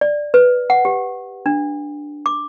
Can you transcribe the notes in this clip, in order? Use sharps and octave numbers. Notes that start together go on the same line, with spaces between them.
D5
B4
F#5
G4
D4
D6